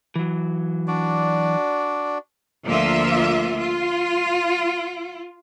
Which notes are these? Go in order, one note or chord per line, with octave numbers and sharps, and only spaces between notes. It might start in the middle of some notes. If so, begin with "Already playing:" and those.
E3 F#3
D4 F#4 D5
D2 F3 A#3 F4 E5
F4